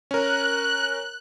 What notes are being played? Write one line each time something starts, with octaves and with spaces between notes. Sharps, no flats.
C#4 A#4 F#6